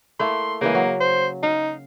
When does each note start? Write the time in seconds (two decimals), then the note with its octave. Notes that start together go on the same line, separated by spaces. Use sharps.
0.20 A3 A#3 E4 C6
0.61 C#3 E3 G#3 A#3
0.75 F#3
1.00 C5
1.43 D#4 F5